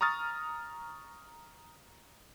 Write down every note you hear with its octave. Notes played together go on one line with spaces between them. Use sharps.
A#5 C#6 D#6 F6 A6